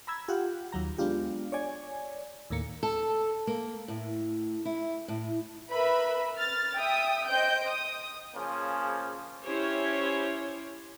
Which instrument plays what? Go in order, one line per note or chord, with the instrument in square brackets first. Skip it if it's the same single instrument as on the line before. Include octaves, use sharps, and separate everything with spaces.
[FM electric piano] A#5 B5 E6 G#6
F4 G4 F#5
D#2 F#3 A#5
G#3 B3 D4 F4 G4
C#5 D5 G#5
D#2 A2 A#3 C#7
[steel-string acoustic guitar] A4
A#3
A2
E4
A2
[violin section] A#4 B4 E5 B5
F6 A6
E5 G5 D#6
C5 D#5 G5 G6 D7
D#6
[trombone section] C#3 F3 A#3 C#4 G#4
[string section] C#4 E4 G4 C5 C#5